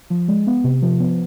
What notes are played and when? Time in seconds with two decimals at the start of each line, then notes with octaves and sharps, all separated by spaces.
0.10 F3
0.28 G#3
0.47 B3
0.64 C3
0.82 F3
1.00 B3